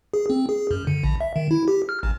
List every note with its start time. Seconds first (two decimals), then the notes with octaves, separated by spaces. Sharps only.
0.14 G#4
0.30 C4
0.49 G#4
0.71 F#2
0.87 D3
1.03 A#1
1.21 E5
1.36 D#3
1.51 E4
1.68 G4
1.89 F6
2.03 A1